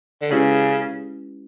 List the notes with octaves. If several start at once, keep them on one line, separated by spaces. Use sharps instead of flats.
D3
C#3 G#3 C#4 E4 G4 B4